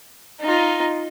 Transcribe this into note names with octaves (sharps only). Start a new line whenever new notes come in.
D#4 F4